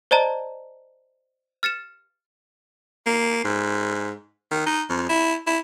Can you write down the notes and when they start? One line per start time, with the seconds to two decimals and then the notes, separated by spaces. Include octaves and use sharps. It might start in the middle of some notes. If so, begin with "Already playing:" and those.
0.11 C5 D5 D#5 A5 A#5
1.63 F6 A6 C#7 E7
3.06 A#3
3.45 G#2
4.51 D#3
4.66 D#4
4.90 F2
5.09 E4
5.47 E4